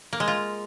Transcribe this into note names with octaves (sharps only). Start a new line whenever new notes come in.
A#3
G#3
F4